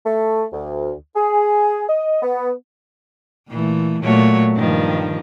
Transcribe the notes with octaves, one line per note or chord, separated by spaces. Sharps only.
A3
D2
G#4
D#5
B3
A#2 E3 A3
A#2 F#3 A3 C#5
G2 D#3 F3